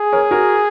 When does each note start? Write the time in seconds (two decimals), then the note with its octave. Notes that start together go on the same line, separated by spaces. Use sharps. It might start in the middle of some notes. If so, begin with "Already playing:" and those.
Already playing: G#4
0.13 A#4 C#5
0.31 F#4 A#4